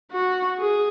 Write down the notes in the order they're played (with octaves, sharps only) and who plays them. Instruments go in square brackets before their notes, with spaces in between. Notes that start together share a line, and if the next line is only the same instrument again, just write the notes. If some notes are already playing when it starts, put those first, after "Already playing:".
[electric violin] F#4
G#4